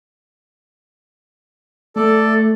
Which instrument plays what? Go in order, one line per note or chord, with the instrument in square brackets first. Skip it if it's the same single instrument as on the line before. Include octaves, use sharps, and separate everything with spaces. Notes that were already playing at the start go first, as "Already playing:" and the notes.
[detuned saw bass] A3 [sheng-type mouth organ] A4 D5